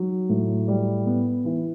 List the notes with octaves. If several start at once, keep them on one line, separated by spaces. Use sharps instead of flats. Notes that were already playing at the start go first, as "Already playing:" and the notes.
Already playing: F#3 D#4
A2
G3
B3
E3